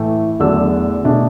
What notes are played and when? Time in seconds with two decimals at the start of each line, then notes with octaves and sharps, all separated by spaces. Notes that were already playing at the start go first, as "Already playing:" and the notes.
Already playing: A2 E3 A3
0.40 E2 D3 F#3 A3 D4 E6
1.04 B2 A3 D4